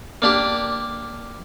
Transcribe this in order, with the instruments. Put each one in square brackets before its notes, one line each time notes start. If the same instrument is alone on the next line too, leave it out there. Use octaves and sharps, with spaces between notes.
[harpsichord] A#3 D4 G4